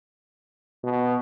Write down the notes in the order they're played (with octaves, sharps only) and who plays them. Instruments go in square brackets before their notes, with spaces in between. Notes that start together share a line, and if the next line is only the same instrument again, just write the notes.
[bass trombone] B2